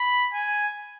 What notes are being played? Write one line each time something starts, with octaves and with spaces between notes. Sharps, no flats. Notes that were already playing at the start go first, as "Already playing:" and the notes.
Already playing: B5
G#5